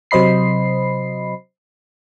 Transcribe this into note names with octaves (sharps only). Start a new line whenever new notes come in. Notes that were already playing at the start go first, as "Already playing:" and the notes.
C3 F#3 C5 D#5 B5 C7